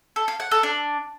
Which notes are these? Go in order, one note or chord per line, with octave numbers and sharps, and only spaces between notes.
A4
F5
F#5
A4
D4